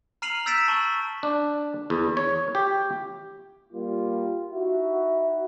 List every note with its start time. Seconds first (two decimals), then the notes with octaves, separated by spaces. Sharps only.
0.22 A#5 F6 C7 D#7 F7 F#7
0.46 E6 G6 A6 B6 D7 E7
0.68 A5 C#6 F#7
1.23 D4
1.90 E2
2.17 C#5
2.55 G4
3.73 G3 A#3 F4
4.52 D#4 E4 F#4